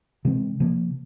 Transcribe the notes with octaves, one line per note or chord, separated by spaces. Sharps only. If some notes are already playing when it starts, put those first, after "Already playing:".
C3 E3 G#3 C4
C3 F3 A#3